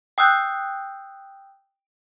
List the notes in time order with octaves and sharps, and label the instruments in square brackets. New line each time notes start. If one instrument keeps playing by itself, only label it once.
[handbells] G5 D#6 E6 F#6 G6